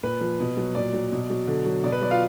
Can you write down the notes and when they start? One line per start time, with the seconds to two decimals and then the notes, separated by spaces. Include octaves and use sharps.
0.03 A#2 B4
0.21 F3
0.40 B2
0.57 F#3
0.75 A#2 D5
0.93 F#3
1.12 B2
1.30 F#3
1.47 D3
1.66 F#3
1.84 B2 D5
1.92 B4
2.01 F#3 D5
2.11 F4 F5